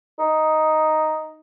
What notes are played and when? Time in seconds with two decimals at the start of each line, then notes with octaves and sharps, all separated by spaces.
0.19 D#4